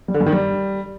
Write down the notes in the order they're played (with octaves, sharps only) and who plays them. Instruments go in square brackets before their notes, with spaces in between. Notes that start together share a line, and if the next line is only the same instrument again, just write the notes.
[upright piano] G3
D3
G2
D#3
G3